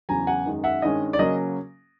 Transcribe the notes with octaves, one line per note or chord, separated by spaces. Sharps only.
E2 C#3 F#3 G#5 A#5
F#5 G#5
F#2 D#3 G#3
E5 F#5
G2 D#3 G#3 C#4 D#5
D5
C#3 F#3 A#3 C#4 D#5